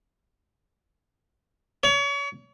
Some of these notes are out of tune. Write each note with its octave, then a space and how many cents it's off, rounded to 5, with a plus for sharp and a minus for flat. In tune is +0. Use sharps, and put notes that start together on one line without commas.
C#5 +35